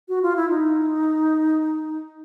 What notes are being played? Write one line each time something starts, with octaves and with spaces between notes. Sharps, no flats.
F#4
F4
E4
D#4